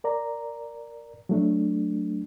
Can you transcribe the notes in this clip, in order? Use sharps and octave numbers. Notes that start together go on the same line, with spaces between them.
A#4 D5 A#5
F#3 A3 D4